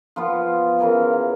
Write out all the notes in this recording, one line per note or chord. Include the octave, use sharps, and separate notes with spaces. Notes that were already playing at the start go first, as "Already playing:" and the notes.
F3 B3 F4
C#3 E3 A#4 G#5
A#4